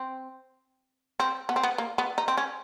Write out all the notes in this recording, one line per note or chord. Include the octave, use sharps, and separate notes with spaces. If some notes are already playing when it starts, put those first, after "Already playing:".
Already playing: C4
C4
B3
C4
B3
A#3
B3
D#4
C4
C#4